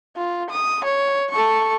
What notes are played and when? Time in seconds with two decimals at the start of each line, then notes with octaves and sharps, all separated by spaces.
0.17 F4
0.50 D#6
0.84 C#5
1.30 A4 C#6